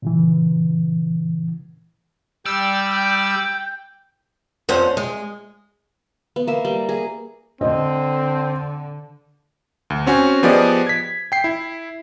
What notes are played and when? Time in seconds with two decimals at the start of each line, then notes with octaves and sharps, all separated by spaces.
0.02 A#2 C#3 E3
2.46 G3 D5 G5 E6
4.69 F2 C#4 C5 F#5
4.97 G#3
6.36 B3
6.47 A#3 E5
6.65 G3
6.89 G#4
7.61 D3 C4 D#5
9.90 D2
10.06 C4 C#4 F#4 G#5
10.43 F3 B3 G4 G#4 D5 D#5
10.87 G#6 B6
11.32 G5 C7
11.44 E4